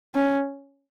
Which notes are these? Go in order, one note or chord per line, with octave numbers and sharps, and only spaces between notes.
C#4